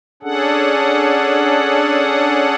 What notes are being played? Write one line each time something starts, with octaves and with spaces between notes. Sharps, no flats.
C#4 D4 G#4 A4 F#5